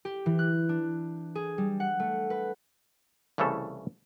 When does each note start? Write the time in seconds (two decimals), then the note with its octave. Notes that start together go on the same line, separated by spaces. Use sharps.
0.05 G4
0.26 E3
0.39 F#6
0.69 D4
1.35 G#4
1.58 G3
1.80 F#5
2.00 A3
2.30 B4
3.38 C2 C#3 E3 A3 A4